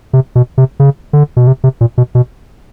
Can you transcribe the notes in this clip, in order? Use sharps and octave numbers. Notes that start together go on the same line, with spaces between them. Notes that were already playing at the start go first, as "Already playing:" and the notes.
C3
B2
C3
C#3
D3
B2
C3
C3
A#2
B2
B2